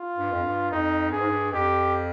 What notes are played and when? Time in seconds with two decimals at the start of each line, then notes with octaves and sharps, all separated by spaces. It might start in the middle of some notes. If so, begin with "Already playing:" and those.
Already playing: F4
0.17 G2
0.32 F2
0.44 G2
0.71 F2 D#4
1.11 G2 G#4
1.21 G#2
1.29 G2
1.53 F2 G4